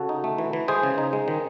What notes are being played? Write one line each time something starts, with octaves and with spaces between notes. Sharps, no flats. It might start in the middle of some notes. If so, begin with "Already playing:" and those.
Already playing: C#3 F#4 A4
D#4
A3
E3
E3
G#3 G#4 C5
C#3
D#4
G#3
D#3